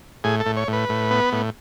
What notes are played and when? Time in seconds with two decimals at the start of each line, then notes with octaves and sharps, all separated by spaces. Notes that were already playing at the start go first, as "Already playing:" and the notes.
0.24 A2 G#4
0.40 A4
0.46 A2
0.57 C#5
0.68 A2
0.73 B4
0.89 A2
1.11 B3
1.32 A2